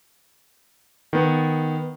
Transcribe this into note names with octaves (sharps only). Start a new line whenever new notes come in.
D#3 B3